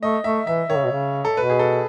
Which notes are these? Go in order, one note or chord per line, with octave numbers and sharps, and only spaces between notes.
A3 D#5
A3 E5
E3 E5
D#3 C#5
C#3
B2
C#3
A4
B2 B4
G#4
A4